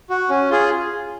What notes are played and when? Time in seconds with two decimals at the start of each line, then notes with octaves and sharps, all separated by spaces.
0.10 F#4
0.29 C#4
0.50 F4 G#4